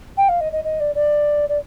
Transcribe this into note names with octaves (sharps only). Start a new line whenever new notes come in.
G5
F5
D#5
D#5
D#5
D5
D5
D5